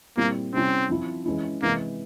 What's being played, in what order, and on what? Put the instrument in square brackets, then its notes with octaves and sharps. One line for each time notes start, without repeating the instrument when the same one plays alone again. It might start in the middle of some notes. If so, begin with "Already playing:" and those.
[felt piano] A#2 G3 C4 E4 [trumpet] A#3
[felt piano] C3 G3 C#4 E4 [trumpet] C4
[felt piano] F3 C4 E4
E3 G#3 C#4 E4
[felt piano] C3 E3 G#3 [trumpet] A#3